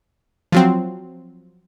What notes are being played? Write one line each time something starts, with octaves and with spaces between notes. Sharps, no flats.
F3 F#3 C4